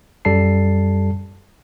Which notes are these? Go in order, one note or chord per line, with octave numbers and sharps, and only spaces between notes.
F#2 G3 A4 A5 C7